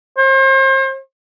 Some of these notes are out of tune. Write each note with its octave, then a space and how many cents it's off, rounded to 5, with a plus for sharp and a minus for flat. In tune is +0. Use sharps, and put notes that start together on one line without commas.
C5 +40